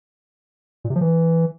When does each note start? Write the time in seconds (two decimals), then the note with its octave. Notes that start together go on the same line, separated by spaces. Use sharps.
0.85 A#2
0.90 C3
0.96 F3
1.01 E3